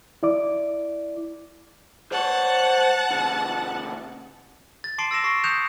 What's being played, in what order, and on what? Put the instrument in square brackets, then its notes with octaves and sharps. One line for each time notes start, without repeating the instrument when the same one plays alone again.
[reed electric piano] E4 D5 D6
[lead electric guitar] C5 C#5 [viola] F#5 A5
[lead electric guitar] B2 D3
[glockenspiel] A6
A5 C6 D6 C7 D7 F#7
E6 A6 A#6 E7
C#6 A#6 C7
D#6 F#6 G6 C#7 E7 F7